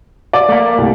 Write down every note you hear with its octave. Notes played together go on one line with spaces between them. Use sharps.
D5
A3 A#3
C2